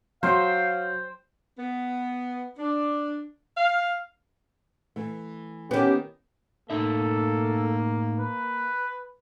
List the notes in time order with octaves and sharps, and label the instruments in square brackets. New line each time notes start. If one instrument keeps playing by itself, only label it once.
[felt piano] F#3 [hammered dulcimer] C5 G5 [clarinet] F5
[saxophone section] B3
D4
F5
[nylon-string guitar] E3 A3
[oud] D#3 B3 [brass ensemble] C#4 G4
[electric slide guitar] A2 D#4 E5 [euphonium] A#3 [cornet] A4
[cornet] B4